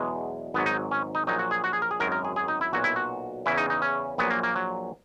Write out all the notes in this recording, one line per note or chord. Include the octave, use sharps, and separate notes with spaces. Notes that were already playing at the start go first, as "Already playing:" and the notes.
Already playing: E2 B2 F#3 G#3
G#1 G#2 F#3 B3
D#4
C#4
D#4
A#1 A#2 F#3 D#4
F#4
G#4
F#4
G#4
A#4
G#4
G#1 F#2 D#3 F#3 A#4
A#4
G#4
G#4
D#4
E4
B1 A#2 F#3 F#4
E4
F#4
E2 C#3 E3 E4
D#4
D#4
C#4
A#1 A#2 F#3 B3
A#3
A#3
F#3